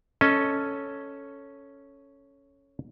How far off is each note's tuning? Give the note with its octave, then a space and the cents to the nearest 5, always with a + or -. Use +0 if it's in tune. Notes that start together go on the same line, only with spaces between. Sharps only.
C#4 +0 A4 +0 D#5 +0